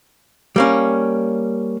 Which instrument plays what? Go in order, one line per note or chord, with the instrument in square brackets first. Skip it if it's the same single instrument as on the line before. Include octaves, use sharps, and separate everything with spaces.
[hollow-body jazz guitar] G3 A#3 C#4